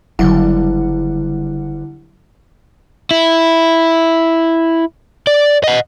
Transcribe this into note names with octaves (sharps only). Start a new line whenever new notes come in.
F#1 D3 F#3 G3 E4 F#5
E4
D5
D#5 F#5